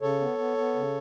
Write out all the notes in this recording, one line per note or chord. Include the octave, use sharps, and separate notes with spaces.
C#3 A4 C#5
B3
B3
B3
C#3